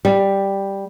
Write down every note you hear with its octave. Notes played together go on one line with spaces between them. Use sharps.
G3